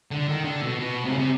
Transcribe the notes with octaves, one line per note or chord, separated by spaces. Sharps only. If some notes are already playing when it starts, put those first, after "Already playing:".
D3
D#3
D3
B2
B2
C3
C#3
C3